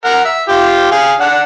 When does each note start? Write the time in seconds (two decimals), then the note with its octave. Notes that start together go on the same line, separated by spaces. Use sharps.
0.05 A#4 F#5
0.25 E5
0.49 F4 G4
0.91 G#4 F5
1.20 D4 F#5